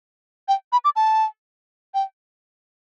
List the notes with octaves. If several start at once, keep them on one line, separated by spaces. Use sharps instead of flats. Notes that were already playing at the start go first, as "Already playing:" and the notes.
G5
B5
D6
A5
G5